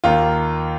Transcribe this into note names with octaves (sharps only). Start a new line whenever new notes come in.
D#2 D#3 A#3 F4